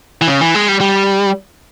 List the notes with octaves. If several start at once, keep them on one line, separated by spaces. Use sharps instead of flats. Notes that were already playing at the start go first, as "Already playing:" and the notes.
E3
C#3
E3
G#3
G3
G3